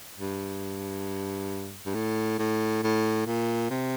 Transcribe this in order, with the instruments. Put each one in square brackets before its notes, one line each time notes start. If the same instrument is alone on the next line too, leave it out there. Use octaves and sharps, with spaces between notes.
[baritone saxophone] G2
G2
A2
A2
A2
A#2
C3